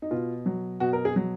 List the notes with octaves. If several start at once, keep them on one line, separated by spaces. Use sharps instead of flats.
D#4
B2 F4
F#3
B2 F#4
A#4
G#4
F#3